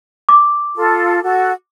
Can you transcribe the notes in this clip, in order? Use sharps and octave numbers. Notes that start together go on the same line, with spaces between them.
D6
F4 A4
F#4 A4